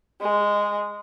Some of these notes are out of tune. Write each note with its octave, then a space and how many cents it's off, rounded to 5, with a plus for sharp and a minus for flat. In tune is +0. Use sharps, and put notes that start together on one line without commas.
G#3 -10